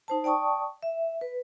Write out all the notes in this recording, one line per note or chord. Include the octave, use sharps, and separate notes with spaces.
D#4 C5 A5
D5 G5 A5 C#6 D#6
E5
B4